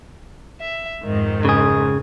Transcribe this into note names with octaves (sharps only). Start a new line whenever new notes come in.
E5
F2 G#2 D#3
C#3 G#4